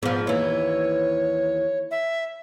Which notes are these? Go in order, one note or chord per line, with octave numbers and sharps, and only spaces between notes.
G#2 F3 B3
D#2 E3 C#5
E5